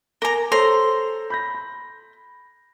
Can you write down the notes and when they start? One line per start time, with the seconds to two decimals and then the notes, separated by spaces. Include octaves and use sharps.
0.22 A#4 G#5 A#5 D6 G7
0.52 A4 C5 C#5 A#5 C6
1.30 B5 G6 A#6
1.55 B5